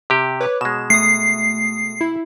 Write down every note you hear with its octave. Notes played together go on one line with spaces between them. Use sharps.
C3 G4
B4 C#5 D6
B2 G#3 E7
A3 D#6 C7
E4